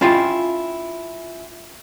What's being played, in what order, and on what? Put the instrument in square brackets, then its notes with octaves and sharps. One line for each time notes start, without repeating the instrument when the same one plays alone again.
[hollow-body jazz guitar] C#4 E4 F4 F5 G5